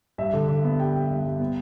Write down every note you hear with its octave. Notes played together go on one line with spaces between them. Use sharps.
G2 E5
D3
D3
B3
G3 G5
G3
G2
G2
B3